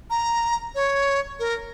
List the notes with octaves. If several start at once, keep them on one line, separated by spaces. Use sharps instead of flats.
A#5
C#5
A#4